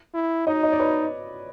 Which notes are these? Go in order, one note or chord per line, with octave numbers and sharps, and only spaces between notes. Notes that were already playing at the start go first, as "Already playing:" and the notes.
E4
D#4 C#5 D#5
C#5 D#5
D5
B4 C#5